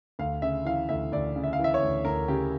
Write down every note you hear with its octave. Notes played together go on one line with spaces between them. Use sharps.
D2 F5
C#3 E5
E3 F5
D2 E5
D2 D5
C#3
E5
F5
E3 E5
C#5
D2
D2 A#4
C#3 G4